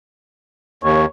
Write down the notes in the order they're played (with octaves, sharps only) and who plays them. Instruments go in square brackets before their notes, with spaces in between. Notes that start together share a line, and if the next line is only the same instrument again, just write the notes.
[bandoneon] D#2 [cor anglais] C#5